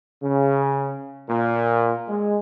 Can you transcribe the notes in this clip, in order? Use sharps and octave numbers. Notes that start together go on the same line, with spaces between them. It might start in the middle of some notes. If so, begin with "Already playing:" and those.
C#3
A#2
G#3